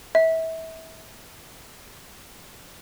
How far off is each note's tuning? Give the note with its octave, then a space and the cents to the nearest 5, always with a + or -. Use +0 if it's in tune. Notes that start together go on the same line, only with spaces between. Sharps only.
E5 -30